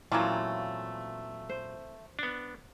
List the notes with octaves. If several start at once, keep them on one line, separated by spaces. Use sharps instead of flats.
A#2 E3 F#3 A3 A#3 C4 C#4 F4
C5
B3 D4